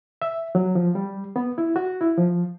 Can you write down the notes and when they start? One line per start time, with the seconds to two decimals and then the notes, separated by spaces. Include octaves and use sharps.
0.22 E5
0.55 F#3
0.75 F3
0.95 G3
1.36 B3
1.58 E4
1.76 F#4
2.01 E4
2.18 F3